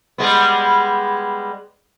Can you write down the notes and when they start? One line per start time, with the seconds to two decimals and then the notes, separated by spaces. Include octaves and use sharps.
0.18 G3 G#3 B3